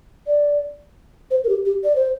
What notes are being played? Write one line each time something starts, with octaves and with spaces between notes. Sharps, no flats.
D5
C5
A#4
G4
G4
D5
C5